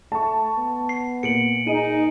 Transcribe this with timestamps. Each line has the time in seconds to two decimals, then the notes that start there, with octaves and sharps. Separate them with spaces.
0.12 A3 A5 C#6
0.58 B3
0.89 C7
1.23 A#2 C#7 D7 F#7
1.67 D#4 G#4 D#7